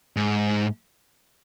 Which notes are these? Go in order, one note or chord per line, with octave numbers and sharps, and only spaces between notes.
G#2